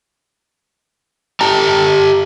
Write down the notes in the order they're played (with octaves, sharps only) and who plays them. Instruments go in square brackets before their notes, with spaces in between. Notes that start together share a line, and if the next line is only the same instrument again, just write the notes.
[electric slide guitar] G4 A5 A#5